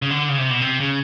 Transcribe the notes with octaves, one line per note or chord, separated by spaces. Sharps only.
C#3
D3
C#3
C3
B2
C3
C#3